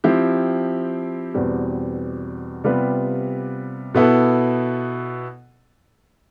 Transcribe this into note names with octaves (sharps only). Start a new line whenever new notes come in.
F3 C4 E4 G4
E2 B2 G3 C4
C3 G3 B3 F4 B4
B2 B3 E4 A4